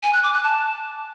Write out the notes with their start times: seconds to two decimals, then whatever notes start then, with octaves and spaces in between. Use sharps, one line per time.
0.03 G#5
0.13 F#6
0.23 D6
0.33 F#6
0.43 A5